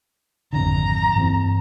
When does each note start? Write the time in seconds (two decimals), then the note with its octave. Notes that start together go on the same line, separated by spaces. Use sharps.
0.53 G#1 F2 D3 A#5
1.15 G2 E3 C4